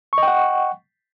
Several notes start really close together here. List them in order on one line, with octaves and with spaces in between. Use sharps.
C#6 D#5 G5 F#5